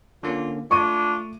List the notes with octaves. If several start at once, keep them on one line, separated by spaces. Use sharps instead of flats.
D3 A#3 C#4 F4
A3 D4 F4 C#6 D6 D#7